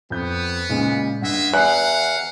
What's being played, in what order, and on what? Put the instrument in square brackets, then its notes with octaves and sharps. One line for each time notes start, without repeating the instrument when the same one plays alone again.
[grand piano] F2 G6 [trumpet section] B3
[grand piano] A#2 C#3 G#3
[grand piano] G2 F#5 [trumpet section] G#3 E5
[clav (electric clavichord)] E2 [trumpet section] F5 F#5 [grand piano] F#6